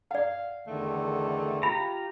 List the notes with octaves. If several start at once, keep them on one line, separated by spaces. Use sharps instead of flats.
D5 F5 F#5
E2 D3 D#3 A3
F4 G4 A#5 B5